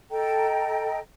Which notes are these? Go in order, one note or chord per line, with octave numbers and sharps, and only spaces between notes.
A4 D#5 G5 A#5